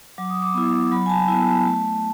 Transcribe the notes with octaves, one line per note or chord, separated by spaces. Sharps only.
F#3 D6
D#6
D6
B3 E4
F#3 B5
G#5
A5
B3 E4 A5
A5
A3 A5